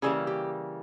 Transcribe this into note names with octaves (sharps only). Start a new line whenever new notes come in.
C#3 E3 G3 A#3 G#4
G4